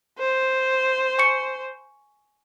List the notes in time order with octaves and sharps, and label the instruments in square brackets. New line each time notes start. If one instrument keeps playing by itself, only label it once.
[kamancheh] C5
[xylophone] G#5 C#6 C#7